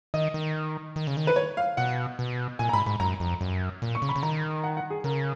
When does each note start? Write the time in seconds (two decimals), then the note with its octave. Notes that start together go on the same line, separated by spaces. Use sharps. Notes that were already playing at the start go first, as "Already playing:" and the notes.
0.14 D#3 D#5
0.34 D#3
0.96 D#3
1.07 C#3
1.17 D#3
1.27 B4
1.36 C#5
1.57 F5
1.77 B2 F#5
2.19 B2
2.59 A#2 G#5
2.69 A#5
2.73 G#2 B5
2.86 G#2 B5
3.00 F#2 A#5
3.20 F2
3.41 F#2
3.82 A#2
3.95 C#6
4.02 C#3
4.09 B5
4.16 C#3
4.23 D#3 A#5
4.64 F#5
4.77 F#5
4.90 G#4
5.04 C#3 A#4